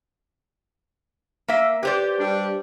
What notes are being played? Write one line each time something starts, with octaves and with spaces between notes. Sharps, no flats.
A#3 E5
G4 B4 C5 D5
G3 D4